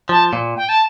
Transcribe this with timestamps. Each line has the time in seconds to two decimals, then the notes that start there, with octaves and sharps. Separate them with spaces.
0.09 F3 A5
0.33 A#2
0.56 G5
0.68 A5